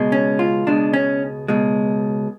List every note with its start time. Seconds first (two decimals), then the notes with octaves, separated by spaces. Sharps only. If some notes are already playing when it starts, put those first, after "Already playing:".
Already playing: C#2 B2 G#3
0.12 C#4
0.39 F4
0.67 C#2 B2 G#3 D4
0.94 C#4
1.48 C#2 B2 G#3